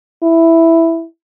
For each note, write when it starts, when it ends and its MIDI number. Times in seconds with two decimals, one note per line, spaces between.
0.23 1.05 64